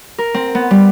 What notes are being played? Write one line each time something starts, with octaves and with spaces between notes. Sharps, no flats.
A#4
C4
B3
G3